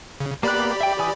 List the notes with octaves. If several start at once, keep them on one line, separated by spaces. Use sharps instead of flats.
C#3
A#3 B3 G4 D5 B5 F#6
E5 G5
E3 G#5 D#6